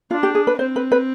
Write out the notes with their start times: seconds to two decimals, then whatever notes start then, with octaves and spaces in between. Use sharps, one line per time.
0.11 D4 F4
0.23 G4
0.35 G#4
0.47 B4
0.59 C4 C5
0.76 B4
0.92 B4